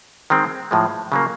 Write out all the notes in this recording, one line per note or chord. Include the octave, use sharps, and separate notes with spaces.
D#3 G#3 C4
A2 F3 G#3
C#3 F#3 A#3